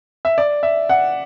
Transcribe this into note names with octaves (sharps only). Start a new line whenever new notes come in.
E5
D5
E5
F#5